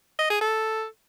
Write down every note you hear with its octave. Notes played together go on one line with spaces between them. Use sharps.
D#5
G#4
A4